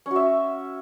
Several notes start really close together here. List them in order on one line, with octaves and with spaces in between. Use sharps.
C#4 F#4 E5